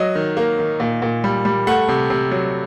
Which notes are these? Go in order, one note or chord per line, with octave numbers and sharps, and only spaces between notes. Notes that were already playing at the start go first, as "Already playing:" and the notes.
Already playing: F#3 D#5
D#3
A#3
D#3
A#2
A#2
G3
G3
A3 F#5
C3
C3
F#3